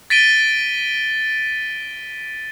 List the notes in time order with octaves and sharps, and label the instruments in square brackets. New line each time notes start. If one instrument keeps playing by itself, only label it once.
[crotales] A6 B6 D7 D#7 G7